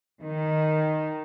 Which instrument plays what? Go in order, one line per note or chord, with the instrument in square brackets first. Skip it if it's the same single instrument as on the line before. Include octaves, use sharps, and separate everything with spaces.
[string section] D#3